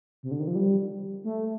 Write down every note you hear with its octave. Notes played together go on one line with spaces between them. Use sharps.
C3
D3
D#3
F3
G3
A3